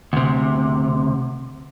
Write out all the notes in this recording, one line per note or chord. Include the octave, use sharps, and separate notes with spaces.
D2 C3